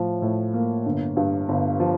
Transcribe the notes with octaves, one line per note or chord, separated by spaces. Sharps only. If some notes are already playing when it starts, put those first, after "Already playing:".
Already playing: A2 F3
A2
A#3
G1
G2
G1
F3